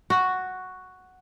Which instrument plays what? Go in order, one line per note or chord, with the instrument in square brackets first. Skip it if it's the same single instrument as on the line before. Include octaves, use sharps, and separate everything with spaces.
[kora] F#4